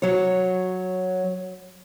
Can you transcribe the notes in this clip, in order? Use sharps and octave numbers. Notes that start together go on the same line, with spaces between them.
F#3 C#5